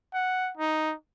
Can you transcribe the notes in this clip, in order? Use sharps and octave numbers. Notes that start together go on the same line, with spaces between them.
F#5
D#4